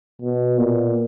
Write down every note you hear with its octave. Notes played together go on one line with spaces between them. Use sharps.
B2
A#2